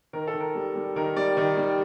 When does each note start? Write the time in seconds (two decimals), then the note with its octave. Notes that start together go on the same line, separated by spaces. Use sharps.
0.13 D#3 A#4
0.27 A4
0.34 D#3
0.41 A#4
0.55 G3
0.75 G3
0.96 D#3 A#4
1.16 G3 D5
1.37 D#3
1.57 G3